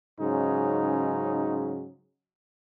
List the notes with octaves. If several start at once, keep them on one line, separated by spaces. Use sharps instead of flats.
G#2 C#3 F#3 C#4 D#4